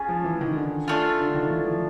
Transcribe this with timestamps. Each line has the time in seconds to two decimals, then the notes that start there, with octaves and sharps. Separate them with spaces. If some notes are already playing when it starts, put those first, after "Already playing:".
Already playing: C#4 F4 G#4
0.09 F3
0.24 E3
0.41 D#3
0.56 D3
0.88 A3 D4 F4
1.19 D3
1.34 D#3
1.51 E3
1.66 F3